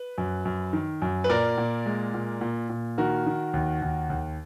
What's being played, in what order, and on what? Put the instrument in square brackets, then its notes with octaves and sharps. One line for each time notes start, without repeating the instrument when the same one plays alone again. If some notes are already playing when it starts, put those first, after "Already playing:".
Already playing: [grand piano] B4
F#2
F#2
D#3
F#2
B4
A#2 A#4 D5
A#2
G#3
A#2
A#2
A#2
D#3 F#4 A#4
D#3
D#2
D#2
D#2